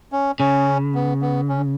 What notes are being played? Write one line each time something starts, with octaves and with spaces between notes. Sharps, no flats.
C#4
C#3 C#4
B3
B3
C#4